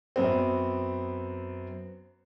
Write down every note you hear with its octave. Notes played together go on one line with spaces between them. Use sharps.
F#2 B3 C4